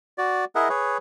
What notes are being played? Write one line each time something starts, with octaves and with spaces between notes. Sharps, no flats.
F#4 D5
E4 G#4 A#4 D#5 E5 F#5
G#4 B4 C#5